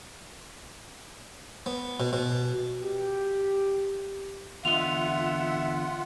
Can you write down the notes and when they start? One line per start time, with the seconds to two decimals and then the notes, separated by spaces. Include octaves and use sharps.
1.66 B3
2.00 B2
2.13 B2
2.83 G4
4.65 E2 D3 F4 D#5 E5 F#5 F7